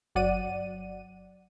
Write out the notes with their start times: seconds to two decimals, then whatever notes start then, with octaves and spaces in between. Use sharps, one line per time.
0.15 G1 F#3 D5 F#5 D#7